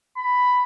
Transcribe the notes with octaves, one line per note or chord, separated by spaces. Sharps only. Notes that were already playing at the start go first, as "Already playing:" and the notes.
B5